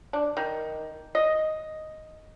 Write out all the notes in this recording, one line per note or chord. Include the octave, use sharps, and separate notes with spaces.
D4
D#3
D#5